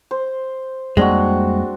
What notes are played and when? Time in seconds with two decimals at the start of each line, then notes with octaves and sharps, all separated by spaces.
0.11 C5
0.97 F2 G3 G#3 A#3 C4 D4 F#4